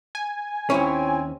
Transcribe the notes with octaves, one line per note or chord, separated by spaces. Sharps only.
G#5
D#2 C4 C#4 E4 C#5